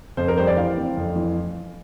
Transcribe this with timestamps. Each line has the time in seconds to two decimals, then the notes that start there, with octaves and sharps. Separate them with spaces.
0.17 F2 C5
0.28 A#4
0.37 G3 C5
0.47 D5
0.57 E3 F5
0.77 C4
0.97 F2
1.16 E3